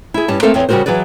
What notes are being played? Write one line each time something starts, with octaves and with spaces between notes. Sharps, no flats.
E4 G#4
G2 G3 C#4 A5
A3 A#3 C4 A4 A#4 F5
E2 C4 C#5
C#3 G3 A3 F#4 A#4 C5
E3 F#3 G#4 B4 D5